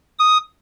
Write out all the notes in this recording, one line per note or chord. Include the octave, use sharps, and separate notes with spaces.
D#6